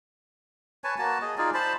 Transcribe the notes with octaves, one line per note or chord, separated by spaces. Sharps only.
B4 C#5 G#5 A5
A#3 F#4 A5
G#4 D#5
D#4 F4 G#4 D5
C5 A5 B5